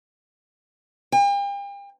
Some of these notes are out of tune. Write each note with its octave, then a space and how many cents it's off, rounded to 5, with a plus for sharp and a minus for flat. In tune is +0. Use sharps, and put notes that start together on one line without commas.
G5 +40